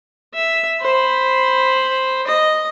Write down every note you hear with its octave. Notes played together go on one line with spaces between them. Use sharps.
E5
C5 B5
D#5